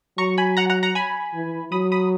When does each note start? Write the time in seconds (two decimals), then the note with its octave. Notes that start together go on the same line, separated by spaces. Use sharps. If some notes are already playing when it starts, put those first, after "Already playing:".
0.18 F#3 A#5 C#6
0.38 G#5 B5
0.57 F#5 A#5
0.70 F#5 A#5
0.83 F#5 A#5
0.95 G#5 B5
1.34 E3
1.72 F#3 B5 D#6
1.92 B5 D#6